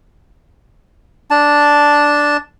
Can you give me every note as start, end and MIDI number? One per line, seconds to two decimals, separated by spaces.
1.31 2.37 62
1.31 2.37 81